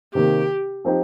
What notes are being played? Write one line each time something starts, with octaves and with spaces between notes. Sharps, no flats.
C3 D#3 A#3 G4
F3 C4 D#4 G4